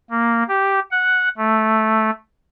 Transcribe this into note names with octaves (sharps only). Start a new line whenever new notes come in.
A#3
G4
F#5
A3